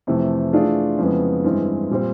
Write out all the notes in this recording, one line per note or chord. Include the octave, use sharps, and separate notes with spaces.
F2 C3 E3 A3
E3 A3 D4 F4 G#4
F2 C#3 E3 G#3 B3
G2 E3 G#3 C4
A#2 G3 C4